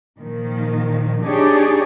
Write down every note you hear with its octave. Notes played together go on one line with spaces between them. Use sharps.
A#2 D#3 F3
D4 D#4 G4 G#4 C#5 D5